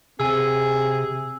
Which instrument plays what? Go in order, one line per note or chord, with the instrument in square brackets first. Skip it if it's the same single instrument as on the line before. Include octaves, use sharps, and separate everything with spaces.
[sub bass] C3 [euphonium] C4 [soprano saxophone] G#4 [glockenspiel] G#5 E6